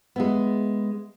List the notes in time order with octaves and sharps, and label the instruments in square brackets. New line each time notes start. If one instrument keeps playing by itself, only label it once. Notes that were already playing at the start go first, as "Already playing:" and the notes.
[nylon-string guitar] G#3 A3 B3